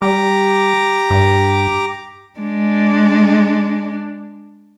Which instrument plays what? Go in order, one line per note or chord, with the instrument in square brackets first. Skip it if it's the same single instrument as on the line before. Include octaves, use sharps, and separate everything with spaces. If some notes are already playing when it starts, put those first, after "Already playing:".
[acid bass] G3 [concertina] G4 A#5 D6
[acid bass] G2
[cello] G#3 D4